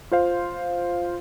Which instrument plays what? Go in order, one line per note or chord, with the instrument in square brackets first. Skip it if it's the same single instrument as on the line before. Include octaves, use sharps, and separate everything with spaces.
[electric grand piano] F4 C5 F5